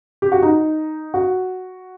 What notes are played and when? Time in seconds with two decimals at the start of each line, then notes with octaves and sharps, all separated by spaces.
0.22 G4
0.32 F#4
0.43 D#4
1.14 F#4